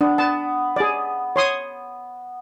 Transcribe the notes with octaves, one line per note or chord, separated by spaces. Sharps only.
B3 D4
B3 A5
G#4 D5
C#5 C6 D#6